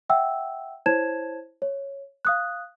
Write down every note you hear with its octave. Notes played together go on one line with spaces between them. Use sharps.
E5 F#5 G5 E6
E4 C5 C#5 A5 G#6 E7
C#5
F5 D#6 F#6